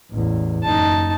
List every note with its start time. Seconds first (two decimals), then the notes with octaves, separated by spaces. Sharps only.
0.11 A1 E2
0.63 F#1 D#4 A5